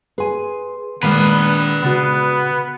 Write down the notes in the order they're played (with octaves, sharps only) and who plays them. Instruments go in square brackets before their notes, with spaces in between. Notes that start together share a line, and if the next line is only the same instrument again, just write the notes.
[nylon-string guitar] G#4 G#5 [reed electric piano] B4 C6
[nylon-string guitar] A#2 G#3 [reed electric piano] D#3 [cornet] B3 [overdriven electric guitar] B4 F5
[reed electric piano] C#3 F#4 [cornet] B3